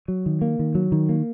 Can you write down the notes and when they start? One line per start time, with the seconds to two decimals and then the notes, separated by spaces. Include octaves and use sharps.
0.08 F#3
0.26 D#3
0.41 A#3
0.59 D#3
0.75 F#3
0.92 D#3
1.09 A#3